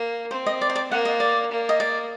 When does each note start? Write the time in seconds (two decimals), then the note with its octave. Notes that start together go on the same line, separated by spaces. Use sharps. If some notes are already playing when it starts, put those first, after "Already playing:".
Already playing: A#3
0.31 C4 C5
0.46 D#5
0.61 D5
0.70 C5
0.75 D5
0.91 A#3 F#5
1.05 D#5
1.20 D5
1.51 A#3
1.69 D#5
1.80 D5